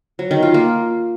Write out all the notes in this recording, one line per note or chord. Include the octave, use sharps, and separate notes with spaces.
F#3
D#3
F4
A#3